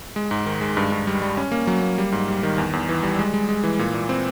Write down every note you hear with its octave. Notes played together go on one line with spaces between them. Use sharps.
G#3
G#2
D#3
G#3
G2
G2
G3
G3
C#4
A#3
F#3
A#3
G3
G#2
G3
D#3
E2
E2
E3
G3
G#3
G#3
G#3
E3
A#2
A#2
C4